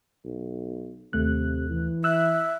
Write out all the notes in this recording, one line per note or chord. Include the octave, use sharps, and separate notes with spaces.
B1
D#2 C3 A3 F#6
E3
E5 E6 F#6